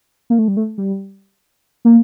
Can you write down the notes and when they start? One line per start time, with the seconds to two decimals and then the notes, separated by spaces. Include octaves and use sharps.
0.30 A#3
0.39 A3
0.48 G3
0.57 A3
0.78 G3
1.85 A#3